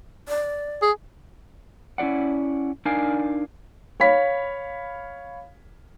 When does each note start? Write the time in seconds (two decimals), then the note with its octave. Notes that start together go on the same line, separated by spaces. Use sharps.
0.28 D5
0.82 G#4
1.98 C#4 E4 F4 D5 F#5
2.85 D4 D#4 A#4 D5 F5 G#5
4.00 C#5 F5 B5 B6